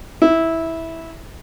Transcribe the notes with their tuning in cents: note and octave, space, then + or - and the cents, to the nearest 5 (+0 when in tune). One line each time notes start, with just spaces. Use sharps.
E4 -10